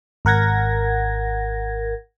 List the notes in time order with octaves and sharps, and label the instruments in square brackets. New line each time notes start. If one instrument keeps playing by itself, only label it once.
[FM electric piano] G#1 A#4 F#5 G#6 A#6